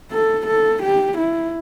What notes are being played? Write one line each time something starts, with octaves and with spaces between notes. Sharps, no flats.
A4
A4
G4
E4